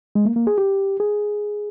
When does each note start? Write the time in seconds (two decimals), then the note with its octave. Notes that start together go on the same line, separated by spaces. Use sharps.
0.15 G#3
0.25 A#3
0.36 A#3
0.47 G#4
0.58 G4
1.00 G#4